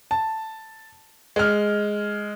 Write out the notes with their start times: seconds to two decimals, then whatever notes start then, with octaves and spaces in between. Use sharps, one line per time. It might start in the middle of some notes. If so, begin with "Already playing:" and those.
0.11 A5
1.36 G#3 F6